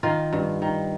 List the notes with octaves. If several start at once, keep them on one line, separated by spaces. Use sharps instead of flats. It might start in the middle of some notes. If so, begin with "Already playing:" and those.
D#3 F4
G2
D#3